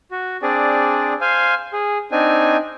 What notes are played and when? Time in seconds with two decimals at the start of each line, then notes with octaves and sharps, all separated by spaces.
0.11 F#4
0.42 C4 D4 G#4 D5
1.21 C5 F5 G#5
1.73 G#4
2.12 C4 D4 D#4 G#5